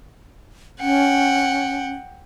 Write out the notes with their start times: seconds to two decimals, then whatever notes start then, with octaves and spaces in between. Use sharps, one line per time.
0.81 C#4 F#5 G5